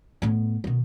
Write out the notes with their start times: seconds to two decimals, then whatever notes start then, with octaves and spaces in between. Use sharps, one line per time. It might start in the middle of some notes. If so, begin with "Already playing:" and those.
0.22 A2 B3
0.64 B2 D#3